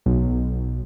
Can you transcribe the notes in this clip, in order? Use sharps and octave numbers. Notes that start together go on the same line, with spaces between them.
B1